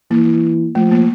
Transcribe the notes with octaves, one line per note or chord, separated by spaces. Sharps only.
E3 A#3
F3 A3
A#3